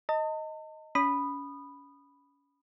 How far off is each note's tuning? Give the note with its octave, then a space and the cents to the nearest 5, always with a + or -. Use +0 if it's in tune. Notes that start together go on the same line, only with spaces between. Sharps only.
D#5 +10 A5 +45
C#4 +35 B5 +0 D#6 -20